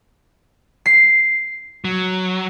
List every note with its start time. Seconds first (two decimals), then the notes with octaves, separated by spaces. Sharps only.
0.86 C7
1.85 F#3